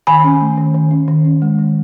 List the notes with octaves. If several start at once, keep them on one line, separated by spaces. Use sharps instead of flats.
D#3 G#5 B5
C#4
A3
D#3
D#3
C#4
D#3
C#4
G#3
D#3